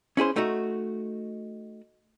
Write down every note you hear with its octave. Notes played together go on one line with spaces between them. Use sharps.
C#4 E4 G#4 C5
A3 D#4 F#4